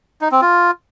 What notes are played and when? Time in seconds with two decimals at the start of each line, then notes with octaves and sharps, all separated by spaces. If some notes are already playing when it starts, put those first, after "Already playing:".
0.21 D#4
0.32 C4
0.42 F4